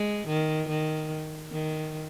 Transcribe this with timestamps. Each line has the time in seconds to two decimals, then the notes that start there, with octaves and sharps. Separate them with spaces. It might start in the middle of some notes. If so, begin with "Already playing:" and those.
Already playing: G#3
0.27 D#3
0.69 D#3
1.52 D#3